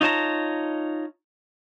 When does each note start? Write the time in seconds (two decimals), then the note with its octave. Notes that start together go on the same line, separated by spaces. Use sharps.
0.01 D#4 F4 C#5 A5 A#5